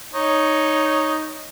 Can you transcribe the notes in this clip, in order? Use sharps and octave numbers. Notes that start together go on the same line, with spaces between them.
D#4 C#5